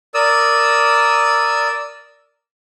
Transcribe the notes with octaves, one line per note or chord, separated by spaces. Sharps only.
A#4 D5 D#6 E6